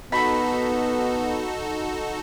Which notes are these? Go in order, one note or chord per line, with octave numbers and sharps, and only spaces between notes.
B3 D#4 F#4 A4 B5